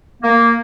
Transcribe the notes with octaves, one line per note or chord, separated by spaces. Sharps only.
A#3